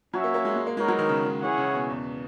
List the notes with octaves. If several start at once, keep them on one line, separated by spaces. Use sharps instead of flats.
F#3 C#4 F#4 C#5 E5
A#3
A#3
G#3
G#3
A#3
G#3 B3 D#4 A#4 C#5
F#3
D#3
C#3
D#3
E3 C#4 E4 G#4 C#5 F#5
C#3
B2
E2